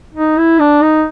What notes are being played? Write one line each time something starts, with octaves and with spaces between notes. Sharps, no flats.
D#4
E4
D4
D#4